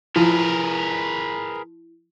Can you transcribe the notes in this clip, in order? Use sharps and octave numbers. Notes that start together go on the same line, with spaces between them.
F3 E4 G#4 A#4 B4